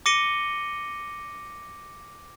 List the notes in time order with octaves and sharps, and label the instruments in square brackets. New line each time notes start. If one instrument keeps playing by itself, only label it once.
[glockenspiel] D6 A#6 C#7 D#7 G7